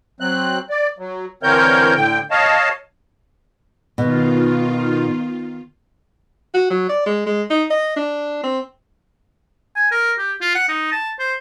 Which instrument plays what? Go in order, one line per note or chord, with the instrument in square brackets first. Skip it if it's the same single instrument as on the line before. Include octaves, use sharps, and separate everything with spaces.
[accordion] F#3 C4 F#6
D5
F#3
D3 E3 C4 A#4 C#5 G6
A2 D3 G5
C#5 D#5 F5 A5
[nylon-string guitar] B2 [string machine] D#3 F4
[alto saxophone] F#4
F#3
D5
G#3
G#3
D#4
D#5
D4
C4
[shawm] G#5
A#4
G4
F4
F#5
D#4
A5
C5